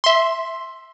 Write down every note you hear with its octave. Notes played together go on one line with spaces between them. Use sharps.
E5 C6